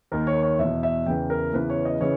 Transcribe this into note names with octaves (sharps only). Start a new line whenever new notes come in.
D#2 D#3 A#4
C#5
C#5
E2 B2 E5
E5
E2 C#3 E3 G5
A#4
E2 C#3 E3 B4
C#5
D#5
C#3 E3 C#5